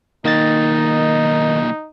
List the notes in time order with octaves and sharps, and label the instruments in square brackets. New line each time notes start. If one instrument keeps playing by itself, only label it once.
[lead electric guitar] B1 A#3 [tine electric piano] D#3 D#5 A6 [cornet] D#4